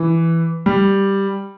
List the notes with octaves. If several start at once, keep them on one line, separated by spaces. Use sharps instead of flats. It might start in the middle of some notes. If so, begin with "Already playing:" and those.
Already playing: E3
G3